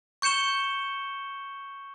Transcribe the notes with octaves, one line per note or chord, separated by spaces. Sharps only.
C#6 G6 C#7 E7 G7